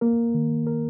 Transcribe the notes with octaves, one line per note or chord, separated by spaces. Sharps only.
A#3 A#4
D#3
A#4